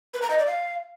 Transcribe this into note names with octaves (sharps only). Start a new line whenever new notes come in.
B4
A#5
D#5
D5
F5